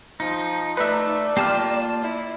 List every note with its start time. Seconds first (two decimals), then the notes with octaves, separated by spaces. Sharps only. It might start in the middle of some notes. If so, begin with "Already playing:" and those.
0.20 F3 D#4
0.77 A3 B4 D5 E5
1.37 A#3 F4 G4 A5 F6
2.01 E4